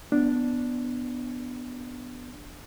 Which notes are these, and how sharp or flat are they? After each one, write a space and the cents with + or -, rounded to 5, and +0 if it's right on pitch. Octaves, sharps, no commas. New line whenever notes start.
B3 +0 D4 +0